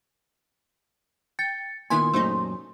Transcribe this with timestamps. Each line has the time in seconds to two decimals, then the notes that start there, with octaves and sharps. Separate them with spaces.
1.39 G5 A6 C#7
1.90 A#2 D#3 B3 E4 G#5 C6
2.14 F#2 A#2 A3 D#4 C5